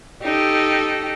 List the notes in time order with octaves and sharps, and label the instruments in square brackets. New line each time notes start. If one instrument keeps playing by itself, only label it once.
[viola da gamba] D#4 G4 A4